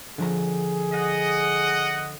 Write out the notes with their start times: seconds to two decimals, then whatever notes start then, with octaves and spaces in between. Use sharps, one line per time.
0.18 D3 F3 G#4 A#5
0.93 D#5 F#5